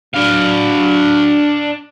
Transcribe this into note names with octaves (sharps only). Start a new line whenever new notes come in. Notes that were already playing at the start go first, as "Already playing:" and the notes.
F#3 D4 F#4 F5